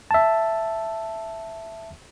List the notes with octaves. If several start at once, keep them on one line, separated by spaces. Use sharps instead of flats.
E5 A5